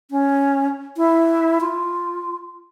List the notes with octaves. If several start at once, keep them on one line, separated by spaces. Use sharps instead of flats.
C#4
E4
F4